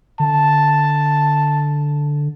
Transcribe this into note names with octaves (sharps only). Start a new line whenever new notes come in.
D3 A5